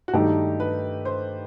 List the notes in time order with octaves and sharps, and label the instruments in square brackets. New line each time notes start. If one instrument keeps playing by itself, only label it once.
[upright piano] F#4
[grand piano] G2 D#3 A3 D#4 [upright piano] G4
[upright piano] B4
C5